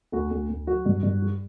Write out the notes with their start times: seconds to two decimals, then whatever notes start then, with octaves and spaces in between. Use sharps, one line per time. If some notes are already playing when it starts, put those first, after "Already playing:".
0.12 D2 F#4
0.31 D2
0.49 D2
0.67 F#3 F#4
0.86 G2
1.03 G2
1.22 G3